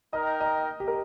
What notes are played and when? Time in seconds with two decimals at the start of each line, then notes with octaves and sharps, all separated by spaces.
0.13 D#4 A#4 D#5 G5
0.41 D#5
0.80 G4
0.88 A#4